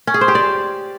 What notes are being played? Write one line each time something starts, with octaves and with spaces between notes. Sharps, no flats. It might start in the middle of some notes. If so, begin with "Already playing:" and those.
C#4
G#4
C5
G4
D5